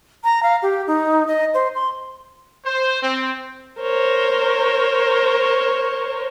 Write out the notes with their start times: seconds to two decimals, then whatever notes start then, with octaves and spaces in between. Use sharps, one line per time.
0.24 A#5
0.43 F5
0.63 G4
0.87 D#4
1.27 D#5
1.54 C5
1.75 C6
2.65 C5
3.03 C4
3.80 A#4 C5 C#5